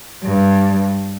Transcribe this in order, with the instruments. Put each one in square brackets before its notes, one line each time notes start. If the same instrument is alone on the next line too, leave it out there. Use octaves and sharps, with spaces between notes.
[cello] G2